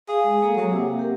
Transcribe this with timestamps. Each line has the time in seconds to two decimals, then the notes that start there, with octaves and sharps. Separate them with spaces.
0.09 G#4 F5
0.24 G#3
0.42 A#3 A4 F5
0.57 F#3 A#3 F#5
0.71 C3
0.99 G4 A#4